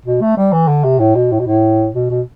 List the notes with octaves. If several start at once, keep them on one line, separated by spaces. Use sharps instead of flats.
B2
A3
G3
E3
D3
C3
A2
B2
A2
B2
A2
B2
B2